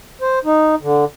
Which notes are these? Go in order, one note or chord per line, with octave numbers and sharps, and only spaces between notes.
C5
D#4
D3